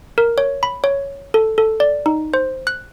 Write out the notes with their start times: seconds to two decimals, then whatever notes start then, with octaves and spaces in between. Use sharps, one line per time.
0.18 A#4
0.38 C#5
0.63 B5
0.84 C#5
1.34 A4
1.58 A4
1.80 D5
2.06 D#4
2.34 C5
2.67 F#6